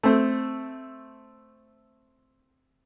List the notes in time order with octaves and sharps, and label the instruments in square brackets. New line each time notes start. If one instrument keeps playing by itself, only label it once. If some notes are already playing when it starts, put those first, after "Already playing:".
[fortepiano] A3 C4